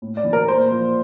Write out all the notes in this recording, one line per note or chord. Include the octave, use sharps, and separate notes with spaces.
A2
D5
E3
A#4
A#2 C5
F3